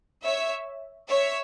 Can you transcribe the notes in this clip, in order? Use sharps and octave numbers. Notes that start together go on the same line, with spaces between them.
C#5 E5
C#5 E5